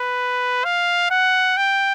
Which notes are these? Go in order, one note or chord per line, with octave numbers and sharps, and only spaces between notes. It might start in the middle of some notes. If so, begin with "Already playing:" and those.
Already playing: B4
F5
F#5
G5